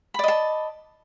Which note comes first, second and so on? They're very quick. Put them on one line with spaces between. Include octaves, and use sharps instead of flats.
B5 D5 D#5 A5